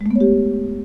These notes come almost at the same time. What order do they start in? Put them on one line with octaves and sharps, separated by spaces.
G#3 A3 B3 C#5 G4